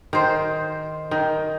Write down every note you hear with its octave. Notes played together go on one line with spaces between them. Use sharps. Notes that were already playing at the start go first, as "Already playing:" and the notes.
D#3 C5
D#3